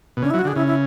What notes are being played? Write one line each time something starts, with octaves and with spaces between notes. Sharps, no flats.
B2
C#3 D4
F#3 E4
F#4
D3
G#4
C#3 E4
E4